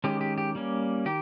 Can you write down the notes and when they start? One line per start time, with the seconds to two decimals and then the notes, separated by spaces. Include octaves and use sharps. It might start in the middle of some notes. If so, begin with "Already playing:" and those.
0.04 D#3 G#3 C#4 G4
0.21 G4
0.38 G4
0.55 G3 A#3 C#4
1.05 D#3 G4